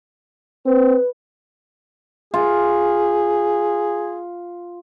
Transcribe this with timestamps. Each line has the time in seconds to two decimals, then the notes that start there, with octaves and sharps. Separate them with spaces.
0.66 C4 B4
2.34 F4 G#4